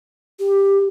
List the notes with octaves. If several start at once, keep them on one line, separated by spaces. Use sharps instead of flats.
G4